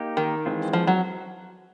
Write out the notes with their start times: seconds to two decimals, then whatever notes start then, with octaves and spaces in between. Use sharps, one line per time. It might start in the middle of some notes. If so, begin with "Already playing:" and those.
Already playing: A#3 D#4 G4
0.17 D#3
0.46 E3 G#3 C4 F4
0.73 F3
0.87 F#3